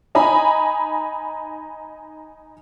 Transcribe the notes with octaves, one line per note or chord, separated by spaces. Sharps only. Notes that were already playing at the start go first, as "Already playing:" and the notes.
D#4 D#5 G#5 A#5 B5